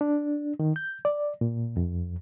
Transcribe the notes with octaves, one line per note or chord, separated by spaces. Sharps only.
D4
D#3
G6
D5
A#2
F2